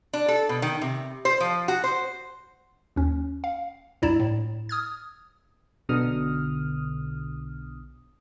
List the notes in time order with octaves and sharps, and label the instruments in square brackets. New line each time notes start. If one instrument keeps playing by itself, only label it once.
[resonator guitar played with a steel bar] D4
A4
B2
D#3
C3
C5
F3
F#4
C5
[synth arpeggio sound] D#2 C#4
F5
C#2 G2 E4 D5 A#5 E7
A2
D#6 F6 G#6
[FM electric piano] B1 B2 D3 D#6 F6